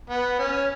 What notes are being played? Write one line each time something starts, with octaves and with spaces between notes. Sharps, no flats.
B3
C#4